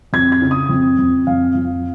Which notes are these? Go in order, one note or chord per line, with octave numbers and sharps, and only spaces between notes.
F2 G#6
G#6
C#3
D#6
F2
F2
F2 F5
F2